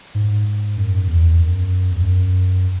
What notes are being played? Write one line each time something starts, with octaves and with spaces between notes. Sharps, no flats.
G#2
F#2
E2
F#2
E2
F#2